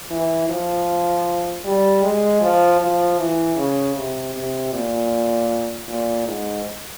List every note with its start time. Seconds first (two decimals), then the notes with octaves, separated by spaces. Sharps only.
0.11 E3
0.49 F3
1.65 G3
2.03 G#3
2.41 F3
2.81 F3
3.18 E3
3.57 C#3
3.96 C3
4.34 C3
4.73 A#2
5.88 A#2
6.26 G#2